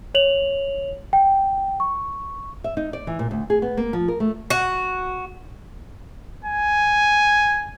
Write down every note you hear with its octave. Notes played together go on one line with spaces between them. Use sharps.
C#5 F7 F#7
G5
C#6
E5
D#4
D5
E3
A#2
D2
G#4
B3
A#3
F3
A#4
A3
F#4
G#5